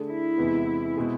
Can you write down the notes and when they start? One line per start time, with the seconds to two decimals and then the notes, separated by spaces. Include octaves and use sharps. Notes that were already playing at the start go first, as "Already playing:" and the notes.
Already playing: D3 A3 D4 G#4
0.09 E4
0.38 E2 C3 G#3 B3
0.97 B2 G#3 C4 G#4